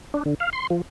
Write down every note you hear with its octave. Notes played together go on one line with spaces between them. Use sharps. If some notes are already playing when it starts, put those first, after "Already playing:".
D4
D3
F5
C6
F3